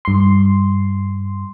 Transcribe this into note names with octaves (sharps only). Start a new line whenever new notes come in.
G2 C6